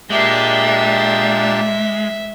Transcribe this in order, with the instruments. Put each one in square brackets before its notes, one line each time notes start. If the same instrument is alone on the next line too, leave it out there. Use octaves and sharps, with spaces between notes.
[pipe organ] A#2 D4 G4 [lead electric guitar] G#3 [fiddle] E5